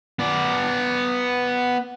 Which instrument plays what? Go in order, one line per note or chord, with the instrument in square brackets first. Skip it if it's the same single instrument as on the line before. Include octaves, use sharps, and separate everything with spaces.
[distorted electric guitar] B3 D5